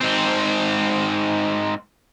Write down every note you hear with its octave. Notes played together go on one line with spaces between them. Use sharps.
G#2 C4